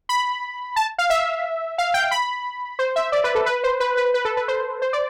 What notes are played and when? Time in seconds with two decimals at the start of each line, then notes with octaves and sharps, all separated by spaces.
0.09 B5
0.76 A5
0.98 F5
1.10 E5
1.78 F5
1.94 G5
2.11 B5
2.79 C5
2.96 E5
3.12 D5
3.24 B4
3.35 A4
3.46 B4
3.64 C5
3.80 B4
3.97 B4
4.14 B4
4.25 A4
4.37 B4
4.48 C5
4.82 C5
4.93 D5